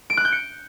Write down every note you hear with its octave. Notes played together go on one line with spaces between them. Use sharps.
D7
F#6
G6
C#7